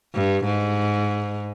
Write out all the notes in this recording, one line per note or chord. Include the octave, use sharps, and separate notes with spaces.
G2
G#2